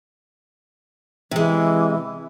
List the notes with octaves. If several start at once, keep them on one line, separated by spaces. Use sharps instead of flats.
C3 E3 G#3